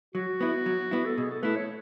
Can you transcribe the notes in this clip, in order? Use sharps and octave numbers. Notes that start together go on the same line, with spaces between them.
F#3 F#4
B3 E4
F#3
B3 E4
A4
B2 G#4
A4
A3 E4 B4
C#5